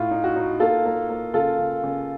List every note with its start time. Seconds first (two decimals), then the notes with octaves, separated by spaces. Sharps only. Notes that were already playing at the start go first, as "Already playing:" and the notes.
Already playing: A2 F4
0.11 D#4
0.24 F#4
0.36 D#4
0.60 A#3 F4 A4
0.85 A#3
1.09 A#3
1.34 C#3 F4 A4
1.59 C#3
1.84 C#3